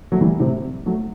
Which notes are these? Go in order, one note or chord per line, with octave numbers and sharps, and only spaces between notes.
F#3 A3
E3 G3
A2 C3
F#3 A3